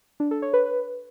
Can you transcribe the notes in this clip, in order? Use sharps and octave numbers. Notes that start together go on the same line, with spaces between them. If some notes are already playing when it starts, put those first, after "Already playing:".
D4
A4
C#5
B4